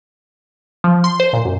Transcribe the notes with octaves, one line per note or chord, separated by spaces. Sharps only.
F3
C6
C5
A#2
F#2